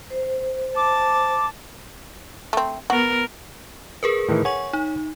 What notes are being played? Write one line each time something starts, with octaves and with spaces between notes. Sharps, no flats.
C5
A5 D6
A3 C4
B3 F#4 A#4
G#4 A#4 B4
A2 D#3 E3
C#5 F#5 G#5 C#6
D#4